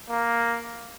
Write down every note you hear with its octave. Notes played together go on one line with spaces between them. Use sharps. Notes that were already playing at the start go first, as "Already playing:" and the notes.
A#3